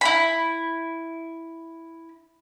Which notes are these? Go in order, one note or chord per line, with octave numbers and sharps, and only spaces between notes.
E4 B5